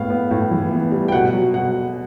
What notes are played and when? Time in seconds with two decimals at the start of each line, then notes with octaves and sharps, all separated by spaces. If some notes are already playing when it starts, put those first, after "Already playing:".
Already playing: A2 B3 F5
0.10 B3
0.31 A2
0.51 E3
0.71 B3
0.92 G3
1.08 G5
1.12 B2 F#5
1.33 F#3
1.54 B2 F#5